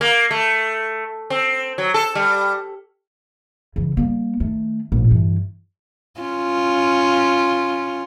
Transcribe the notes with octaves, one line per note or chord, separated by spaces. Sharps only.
A#3
A3
C4
F#3
A4
G3
C#3 E3
G3 A#3
D#3 A3
A#1 A2
G2 E3
C#4 F4